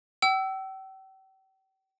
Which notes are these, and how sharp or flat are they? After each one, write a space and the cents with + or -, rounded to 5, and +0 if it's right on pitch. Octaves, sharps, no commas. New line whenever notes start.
G5 -40 E6 +0